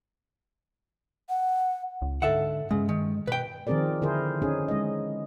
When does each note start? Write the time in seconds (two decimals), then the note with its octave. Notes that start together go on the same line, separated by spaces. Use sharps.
1.29 F#5
2.02 C#2
2.22 G#2 D3 A4 E5 F#5
2.71 G2 C#3 G#3
2.89 D#3
3.27 B2 B4 G5
3.67 D#3 F3 C4 G#4 A#4 D5
4.02 D3 E4 G#4 A#4 C5
4.42 C#4 D#4 G#4
4.68 G#3 D#5